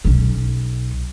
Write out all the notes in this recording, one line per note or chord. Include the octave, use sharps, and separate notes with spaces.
B1 C#4